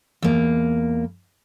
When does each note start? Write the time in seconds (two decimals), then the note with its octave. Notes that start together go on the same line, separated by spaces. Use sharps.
0.22 E2 A#3